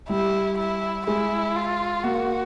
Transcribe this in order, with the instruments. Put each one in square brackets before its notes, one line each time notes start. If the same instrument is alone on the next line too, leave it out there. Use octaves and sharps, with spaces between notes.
[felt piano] G3 [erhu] E4
[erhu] E4
[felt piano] G#3 [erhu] E4
[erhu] F4
[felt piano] A#3 [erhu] F#4